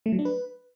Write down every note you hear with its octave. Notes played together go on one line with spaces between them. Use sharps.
A3
F#3
D4
B4